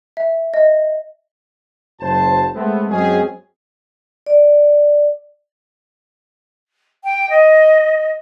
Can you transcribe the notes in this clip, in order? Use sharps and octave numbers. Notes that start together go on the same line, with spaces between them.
E5
D#5
F#1 F#3 C5 A5
G#3 A3 B3 C4
F#2 F#3 G#3 C4 C#4 G#4
D5
G5
D#5